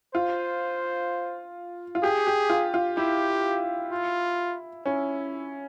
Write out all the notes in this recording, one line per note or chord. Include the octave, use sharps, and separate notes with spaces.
F4 C5
F4
G4 G#4
G4
F4
F4
E4 G4
F4
C#4 E4